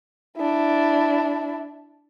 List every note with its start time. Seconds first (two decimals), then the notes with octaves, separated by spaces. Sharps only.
0.37 D4 E4